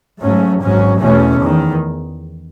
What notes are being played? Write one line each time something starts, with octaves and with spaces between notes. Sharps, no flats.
G#2 F#3 A3 C#4
G#1 G#2 F#3 C#4
E2 B2 A3 C#4
E2 D#3